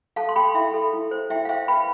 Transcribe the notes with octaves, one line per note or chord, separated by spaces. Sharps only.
A4 F5 A5
C6
A4 G5 B5
E4 E5 G5
A4
E4
C5
E4 E5 G5
F5
C5 E5 G5
B4 G5 B5